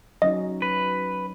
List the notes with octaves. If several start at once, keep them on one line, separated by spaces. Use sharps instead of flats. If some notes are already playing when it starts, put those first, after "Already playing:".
F#3 C#4 D#4 D#5
B4